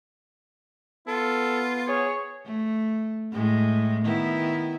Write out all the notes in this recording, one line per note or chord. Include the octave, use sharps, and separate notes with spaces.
B3 F4 A4
G#4 C#5
A3
A2 G#3
D#3 B3 E4